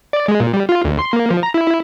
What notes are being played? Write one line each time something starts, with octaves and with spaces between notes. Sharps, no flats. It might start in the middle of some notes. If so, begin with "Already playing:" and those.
D5
G#3
A#2
G3
F4
D2
C6
A#3
F3
A#5
E4
E4